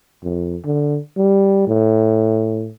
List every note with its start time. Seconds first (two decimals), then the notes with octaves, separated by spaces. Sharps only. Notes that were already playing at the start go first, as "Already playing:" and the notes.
0.23 F2
0.65 D3
1.17 G3
1.68 A2